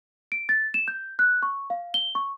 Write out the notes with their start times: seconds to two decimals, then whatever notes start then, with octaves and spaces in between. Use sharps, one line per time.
0.32 D7
0.49 A6
0.74 E7
0.88 G6
1.19 F#6
1.43 C#6
1.70 F5
1.94 G7
2.15 C#6